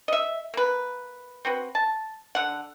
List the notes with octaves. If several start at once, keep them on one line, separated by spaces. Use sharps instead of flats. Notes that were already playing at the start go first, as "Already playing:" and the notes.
D#5 E5
A#3 B4
C4 F#4 B4
A5
D3 F#5